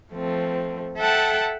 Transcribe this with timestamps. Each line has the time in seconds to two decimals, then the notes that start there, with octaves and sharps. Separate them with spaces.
0.12 F3 A3 C4
0.97 A4 E5 F#5 G5 A5